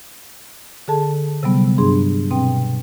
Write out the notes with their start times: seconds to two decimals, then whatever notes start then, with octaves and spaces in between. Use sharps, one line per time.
0.88 D3 G#4 A4 A5
1.43 C3 F#3 G3 B3
1.78 G2 D4 G#4 C6
2.31 B2 C4 G5